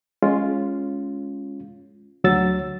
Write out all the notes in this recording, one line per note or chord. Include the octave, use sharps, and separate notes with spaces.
G#3 C#4 F4
D2 F#3 E6 A6